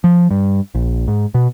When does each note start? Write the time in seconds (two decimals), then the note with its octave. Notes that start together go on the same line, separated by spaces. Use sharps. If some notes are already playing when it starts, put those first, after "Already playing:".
0.04 F3
0.31 G2
0.75 A#1
1.08 G#2
1.34 B2